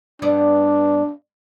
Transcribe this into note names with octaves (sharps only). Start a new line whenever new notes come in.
G2 B3 D4 D5